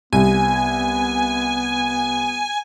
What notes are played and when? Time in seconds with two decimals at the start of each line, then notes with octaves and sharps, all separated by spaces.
0.13 C2 B3 G#5